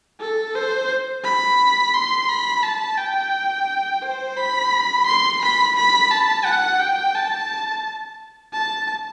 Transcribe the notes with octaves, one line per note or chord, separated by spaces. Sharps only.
A4
C5
B5
C6
B5
A5
G5
C5
B5
C6
B5
B5
A5
F#5
G5
A5
A5